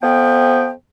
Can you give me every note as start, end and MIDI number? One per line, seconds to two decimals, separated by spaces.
0.02 0.71 41
0.02 0.71 53
0.02 0.71 59
0.02 0.71 79